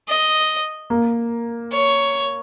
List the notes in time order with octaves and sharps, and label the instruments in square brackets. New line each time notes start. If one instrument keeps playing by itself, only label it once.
[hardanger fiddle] D#5
[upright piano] A#3
[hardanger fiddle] C#5